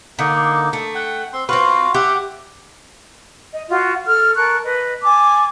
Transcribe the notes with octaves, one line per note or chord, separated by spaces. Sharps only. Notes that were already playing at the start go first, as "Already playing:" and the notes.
D3 A#3 D#4
A3
F#5 G5
C4 C6
C4 F4 F#4 B4 F5
G4 E5 F#5
D#5
F4 F#4
A4 F6
A#4 A5 C#6 F#6
B4 D#5
G#5 A5 D6